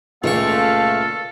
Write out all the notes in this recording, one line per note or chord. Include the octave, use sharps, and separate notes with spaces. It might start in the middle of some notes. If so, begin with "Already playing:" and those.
C#2 A#2 A3 F4 A4 F5 C#6